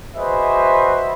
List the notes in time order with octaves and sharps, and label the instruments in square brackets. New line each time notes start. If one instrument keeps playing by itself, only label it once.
[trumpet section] F#4 G#4 B4 C5 D#5 E5